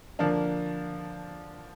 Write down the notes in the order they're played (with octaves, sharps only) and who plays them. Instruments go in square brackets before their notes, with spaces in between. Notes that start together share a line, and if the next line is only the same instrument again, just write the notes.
[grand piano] D3 F3 A#3 D4